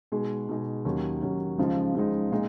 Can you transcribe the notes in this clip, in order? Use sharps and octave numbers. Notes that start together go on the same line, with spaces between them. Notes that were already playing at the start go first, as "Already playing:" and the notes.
B2 G#3 D#4 G#4
B2 G#3 D#4 G#4
D#2 D#3 F#3 C#4
D#2 D#3 F#3 C#4
C#2 C#3 F3 G#3 D#4
C#2 C#3 F3 G#3 D#4
A#2 G#3 D#4